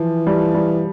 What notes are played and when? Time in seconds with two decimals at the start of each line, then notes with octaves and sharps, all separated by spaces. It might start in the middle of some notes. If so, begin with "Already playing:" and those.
Already playing: E3 F3
0.27 G3
0.54 G3